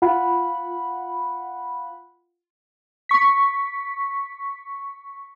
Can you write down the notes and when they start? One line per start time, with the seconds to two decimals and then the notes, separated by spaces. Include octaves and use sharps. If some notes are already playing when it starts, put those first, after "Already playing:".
0.02 F4 F#5 B5
3.09 C#6 B6